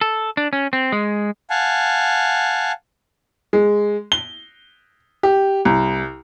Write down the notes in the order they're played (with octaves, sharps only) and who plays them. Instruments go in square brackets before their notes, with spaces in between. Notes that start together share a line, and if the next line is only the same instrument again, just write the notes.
[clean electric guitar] A4
D4
C#4
C4
G#3
[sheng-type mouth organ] F5 F#5 G#5 A5
[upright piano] G#3
G7
G4
C2